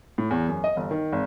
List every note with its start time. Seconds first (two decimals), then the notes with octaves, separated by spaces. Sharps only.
0.18 A2
0.31 E2
0.48 F#2
0.64 D#5
0.77 G1
0.91 D#3
1.13 G#1